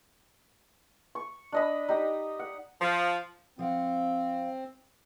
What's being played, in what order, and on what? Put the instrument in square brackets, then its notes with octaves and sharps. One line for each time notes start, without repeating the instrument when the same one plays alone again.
[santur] C#6
D4 D#5 B5
D#4 G4
F#5
[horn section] F3
[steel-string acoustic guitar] F3 F5 F#5 [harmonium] C4